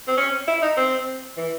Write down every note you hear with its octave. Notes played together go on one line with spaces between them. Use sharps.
C4
C#4
E4
D#4
C4
E3